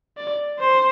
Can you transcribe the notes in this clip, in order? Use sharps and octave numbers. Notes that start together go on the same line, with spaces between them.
D5
C5